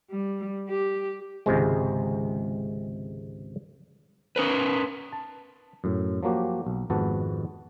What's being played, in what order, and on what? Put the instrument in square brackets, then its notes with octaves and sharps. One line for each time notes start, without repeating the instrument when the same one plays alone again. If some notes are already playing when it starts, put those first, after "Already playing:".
[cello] G3
G4
[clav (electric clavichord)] G#1 C#2 C3 G#3
[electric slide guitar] C#4 A#4 B4
[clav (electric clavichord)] A5
F#2 A2
F3 F#3 A#3 F#4 G4
B1
G#1 F2 G#2 B3 F#4 A5